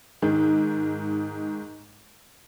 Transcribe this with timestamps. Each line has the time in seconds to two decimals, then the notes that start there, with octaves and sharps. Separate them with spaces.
0.22 G#2 D#3